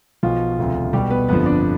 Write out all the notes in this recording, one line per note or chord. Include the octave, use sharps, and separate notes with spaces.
B1 B2 F3 F4
E1 D2 C3
B1 B2 G3 G4
B3 B4
G1 F2 D3 F3 B3 B4
D4 D5